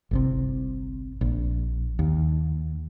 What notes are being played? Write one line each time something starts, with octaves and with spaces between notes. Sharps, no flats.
G1 C2 C3
A#1
D#2